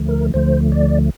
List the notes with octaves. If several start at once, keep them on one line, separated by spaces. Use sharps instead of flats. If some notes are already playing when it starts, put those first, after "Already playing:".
Already playing: D2 D3 F3 A3
A#4
D2 D3 F3 A3 C5
D5